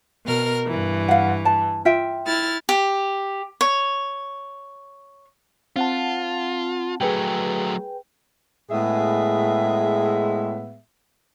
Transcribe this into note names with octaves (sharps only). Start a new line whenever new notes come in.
B2 A#4 F6
G2 E3
F5 F#5
A5
F4 E5 G5
E4 F6 A6
G4
C#5
C4 F4 F#5 A5
F#3 A3 G#4 B4 G5
A2 G#3 B3 G#4 E5